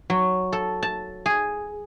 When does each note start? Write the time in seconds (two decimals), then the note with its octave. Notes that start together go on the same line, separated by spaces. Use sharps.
0.10 F#3
0.53 A4
0.83 A5
1.26 G#4